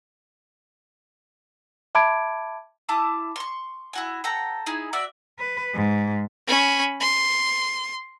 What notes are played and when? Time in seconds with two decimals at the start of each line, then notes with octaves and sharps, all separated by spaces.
1.95 E5 A5 B5 D6 G#6 D7
2.89 E4 A5 D6 D#6
3.36 C6 C#6
3.93 E4 F#4 G#5
4.24 A4 F#5 G5 A#5
4.66 D#4 E4 G#4
4.93 F#4 D5 E5
5.39 B4
5.74 G#2
6.47 C#4 B5
7.00 C6